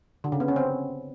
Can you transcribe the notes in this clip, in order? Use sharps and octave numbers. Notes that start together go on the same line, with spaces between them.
D3
C#3
B3
C#4
C4